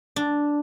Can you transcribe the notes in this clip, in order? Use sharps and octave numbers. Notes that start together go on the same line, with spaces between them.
D4